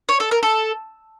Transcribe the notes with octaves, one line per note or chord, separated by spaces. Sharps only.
C#5
A4
A#4
A4